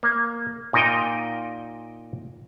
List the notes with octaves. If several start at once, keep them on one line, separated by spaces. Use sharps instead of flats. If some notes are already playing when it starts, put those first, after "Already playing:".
A#3
A#2 D#4 A#4 D#5 G5